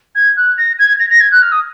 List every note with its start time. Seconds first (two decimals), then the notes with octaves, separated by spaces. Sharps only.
0.15 G#6
0.37 F#6
0.58 A#6
0.79 G#6
0.99 A#6
1.10 A#6
1.20 G#6
1.32 F#6
1.42 F6
1.52 D#6